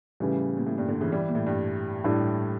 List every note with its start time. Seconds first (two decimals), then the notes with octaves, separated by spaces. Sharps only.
0.20 A2 C#3 E3 G3
0.57 A#2
0.67 A2
0.78 G2 A#2
0.88 A#2 D3
1.01 C#3 E3
1.12 E3 G3
1.28 A#2
1.35 A2
1.46 G2
2.04 A2 G3 D4